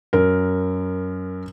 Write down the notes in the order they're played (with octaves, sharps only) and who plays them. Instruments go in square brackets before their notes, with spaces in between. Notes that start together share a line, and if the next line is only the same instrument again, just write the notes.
[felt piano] F#2 A#4